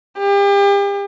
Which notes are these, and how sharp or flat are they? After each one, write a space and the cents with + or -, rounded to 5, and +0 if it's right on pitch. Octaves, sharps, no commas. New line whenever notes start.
G4 +40